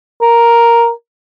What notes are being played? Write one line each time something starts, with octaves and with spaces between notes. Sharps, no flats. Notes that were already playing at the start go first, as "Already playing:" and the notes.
A#4